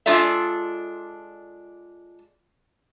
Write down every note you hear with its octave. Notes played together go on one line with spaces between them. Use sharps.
G#3 D4 F4 A4 D5 E5